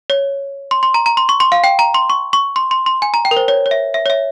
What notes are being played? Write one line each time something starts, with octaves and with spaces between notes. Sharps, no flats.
C#5
C6
C6
A#5
A#5
C6
C#6
C6
F5
G5
A#5
C6
C#6
C#6
C6
C6
C6
G#5
A#5
G5
A#4
C5
C#5
C#5
E5
E5
C#5
E5